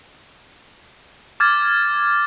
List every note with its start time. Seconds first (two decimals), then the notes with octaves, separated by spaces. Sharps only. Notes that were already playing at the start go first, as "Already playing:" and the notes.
1.40 D6 F6 G#6 A6